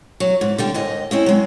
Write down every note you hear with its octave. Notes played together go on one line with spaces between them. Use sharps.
F#3
G#2
D3 G3 G5
D#2 G#2 D#5
C4 C#4 E4
F#3 G#3